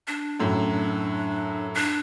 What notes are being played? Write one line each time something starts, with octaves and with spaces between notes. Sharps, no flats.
D4
F#2 A2
D4